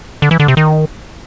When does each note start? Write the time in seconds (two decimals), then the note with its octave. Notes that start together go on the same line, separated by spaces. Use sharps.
0.22 D3
0.31 E3
0.40 D3
0.48 C3
0.57 D#3